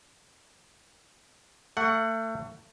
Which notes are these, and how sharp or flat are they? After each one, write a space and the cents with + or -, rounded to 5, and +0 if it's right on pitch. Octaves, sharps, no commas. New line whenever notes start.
A3 +30 F#5 +0